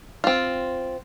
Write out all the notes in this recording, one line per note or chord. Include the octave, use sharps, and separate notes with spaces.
C4 F4